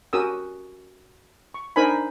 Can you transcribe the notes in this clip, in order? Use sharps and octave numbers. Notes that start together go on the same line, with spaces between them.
C#4 F#4 G4 A#4 D#6 E6
C#6
D4 D#4 A#4 C5 G#5 B5